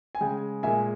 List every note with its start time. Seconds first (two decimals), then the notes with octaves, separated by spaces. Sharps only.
0.15 G#5
0.21 C#3 G#3 G5
0.63 A#2 G#3 E5 G#5